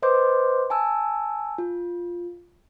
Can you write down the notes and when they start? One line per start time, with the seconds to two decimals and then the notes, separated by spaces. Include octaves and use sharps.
0.02 B4 C5 D#5 C6 D6 G6
0.70 G#5 A5 E6
1.58 F4